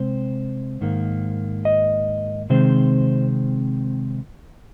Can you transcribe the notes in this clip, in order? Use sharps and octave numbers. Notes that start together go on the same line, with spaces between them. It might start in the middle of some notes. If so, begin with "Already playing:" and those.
Already playing: C3 G#3 C4 C5
G#2 D#3 A#3
D#5
C3 D#3 G#3 C4 C5